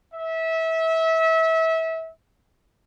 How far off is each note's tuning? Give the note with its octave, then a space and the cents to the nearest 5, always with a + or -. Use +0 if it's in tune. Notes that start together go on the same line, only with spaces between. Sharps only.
E5 -25